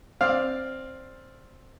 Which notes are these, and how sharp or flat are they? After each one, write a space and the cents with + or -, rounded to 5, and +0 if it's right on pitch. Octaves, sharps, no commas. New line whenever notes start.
C4 +10 D5 +0 F5 +0